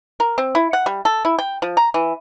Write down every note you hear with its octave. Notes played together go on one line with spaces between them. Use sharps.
A#4
C4
E4
F#5
G3
A4
E4
G5
F3
A#5
E3